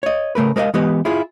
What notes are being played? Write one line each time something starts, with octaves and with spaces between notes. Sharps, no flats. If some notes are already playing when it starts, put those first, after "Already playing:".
C#5 D#5
C#3 A3 A#4 B4
G#3 A#4 B4 D5 D#5 F5
E3 G#3 B3 G4 B4 D#5
E4 F4 G#4